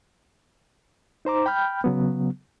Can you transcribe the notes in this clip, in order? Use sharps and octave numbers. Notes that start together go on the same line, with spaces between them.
D#4 C5 A#5 D6
G5 B5 F6 G6
C#3 F#3 B3